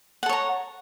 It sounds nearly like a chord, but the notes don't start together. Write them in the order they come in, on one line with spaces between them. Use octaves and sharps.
F#5 A4 C#5 A#5